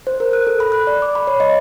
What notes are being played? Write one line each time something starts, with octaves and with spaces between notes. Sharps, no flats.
C5
A#4
F#6
A4
B5
F#6
D5
D6
B5
C#5
D#5